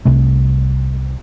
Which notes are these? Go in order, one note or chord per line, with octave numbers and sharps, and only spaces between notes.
C2 C3 A3